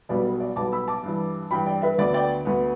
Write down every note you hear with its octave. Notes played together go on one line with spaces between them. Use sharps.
B1 B2 G3 B3 D5
B4
D5
B1 B2 G3 B3 A5 D6
B5 E6
A5 D6
G2 E3 G3
G2 E3 G3 G5 B5
D5 G5
B4 E5
D2 D3 B3 D5
D5 G5
D2 D3 B3